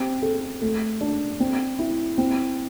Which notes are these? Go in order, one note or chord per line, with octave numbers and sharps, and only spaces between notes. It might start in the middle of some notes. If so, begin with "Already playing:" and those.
Already playing: C4 G4
A4
A3
D4
C4
E4
C4